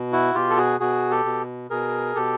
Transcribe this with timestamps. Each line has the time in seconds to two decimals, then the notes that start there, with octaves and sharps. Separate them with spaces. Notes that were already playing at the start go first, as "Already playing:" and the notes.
Already playing: B2
0.12 E4 F#4
0.34 B2 F4 G4
0.50 A4
0.58 F#4 G#4
0.80 B2 F#4 G#4
1.11 G4 A4
1.25 B2
1.70 B2 G#4 A#4
2.15 B2 G4 A4